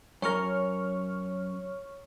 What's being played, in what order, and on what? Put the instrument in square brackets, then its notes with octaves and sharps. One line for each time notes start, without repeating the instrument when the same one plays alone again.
[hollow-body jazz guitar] F#2 A#4 [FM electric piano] C#5 C#6 F6